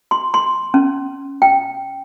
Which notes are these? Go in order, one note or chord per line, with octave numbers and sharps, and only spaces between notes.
C6
C6
C#4
G5